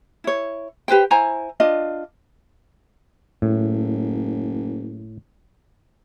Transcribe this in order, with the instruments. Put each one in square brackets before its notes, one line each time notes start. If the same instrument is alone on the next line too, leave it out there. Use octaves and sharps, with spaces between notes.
[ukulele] E4 C#5
G4 B4 C5 G5
E4 C5 G#5 A#5
D4 F4 D#5
[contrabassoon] F#1 [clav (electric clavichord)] A2